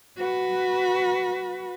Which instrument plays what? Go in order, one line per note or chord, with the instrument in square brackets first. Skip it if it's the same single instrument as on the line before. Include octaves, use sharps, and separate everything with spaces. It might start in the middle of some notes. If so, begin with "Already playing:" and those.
[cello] F#4 B4